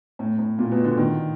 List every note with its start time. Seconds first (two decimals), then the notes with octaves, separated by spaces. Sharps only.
0.19 A2
0.39 A2
0.59 A#2
0.71 B2
0.84 D3
0.97 D#3